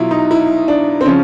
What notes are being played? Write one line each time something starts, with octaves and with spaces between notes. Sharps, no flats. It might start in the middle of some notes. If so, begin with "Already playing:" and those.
Already playing: B2 F#3 E4 F4
D#4
E4
D4
C4
C#3 F3 C#4